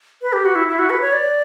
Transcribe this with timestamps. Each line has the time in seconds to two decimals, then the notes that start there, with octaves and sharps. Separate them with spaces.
0.22 B4
0.33 G4
0.45 F#4
0.55 E4
0.68 E4
0.79 F#4
0.90 B4
1.01 C#5
1.13 D5